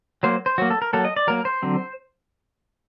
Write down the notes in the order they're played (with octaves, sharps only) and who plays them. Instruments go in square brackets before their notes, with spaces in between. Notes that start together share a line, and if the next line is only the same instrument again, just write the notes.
[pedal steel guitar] F#3 A#3 C5
C5
F#3 A#3 F#4
A4
A#4
F#3 A#3 A4
D#5
D5
F#3 A#3 A#4
C5
D3 F#3 C4